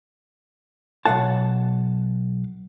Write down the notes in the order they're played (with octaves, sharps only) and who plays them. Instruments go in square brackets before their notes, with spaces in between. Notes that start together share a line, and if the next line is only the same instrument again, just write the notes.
[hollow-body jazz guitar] B1 G#3 F5 F#5 A5